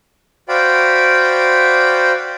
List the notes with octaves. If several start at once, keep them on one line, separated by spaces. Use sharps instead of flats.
F#4 C5 D5 F5 G5 B5